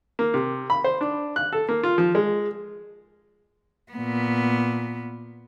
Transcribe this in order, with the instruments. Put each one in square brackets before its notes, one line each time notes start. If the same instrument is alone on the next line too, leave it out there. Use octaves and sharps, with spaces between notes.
[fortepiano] A#3
C3
B5
C5
D4
F#6
A4
A#3
F4
F3
G#3
[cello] A#2 B3